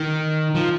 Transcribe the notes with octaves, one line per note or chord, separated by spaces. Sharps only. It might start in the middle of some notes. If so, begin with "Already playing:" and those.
Already playing: D#3
F3